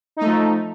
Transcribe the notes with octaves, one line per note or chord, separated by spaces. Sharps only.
F3 A3 D#4